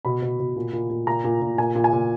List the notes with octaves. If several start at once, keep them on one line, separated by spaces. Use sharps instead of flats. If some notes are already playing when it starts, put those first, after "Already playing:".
B2 B5
B2
B2
A#2
A#2
A#2
A#2 A#5
A#2
A#2
A#2 G#5
A#2
G#5
A#2